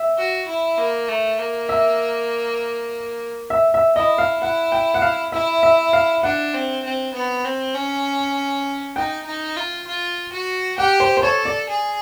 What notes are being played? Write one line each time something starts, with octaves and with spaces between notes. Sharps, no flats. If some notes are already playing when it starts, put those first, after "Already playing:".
Already playing: E5
F#4
E4
A#3
A3
A#3
E5
E5
E5
E4 D#5
F5
E4 F#5
G5
F#5
F5
E4 E5
E5
F5
D4 F#5
C4
C4
B3
C4
C#4
D#4 G5
D#4
F4
F4
F#4
G4 F#5
C5
C5
A4 C#5
D5
G#4